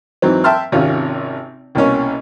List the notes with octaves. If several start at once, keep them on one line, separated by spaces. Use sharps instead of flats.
G#2 E3 F#3 C4
E5 G5 A5 C6 F6
G#1 C3 D#3 C#4 F4
C2 B2 A#3 C#4 C#5